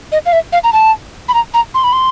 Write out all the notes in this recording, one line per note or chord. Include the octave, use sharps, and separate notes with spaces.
D#5
F5
E5
F5
A#5
A5
B5
A#5
A#5
C6
B5
C6